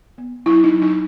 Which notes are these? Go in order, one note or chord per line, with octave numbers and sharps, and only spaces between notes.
B3
F#3 E4
D#4
F#3
D#4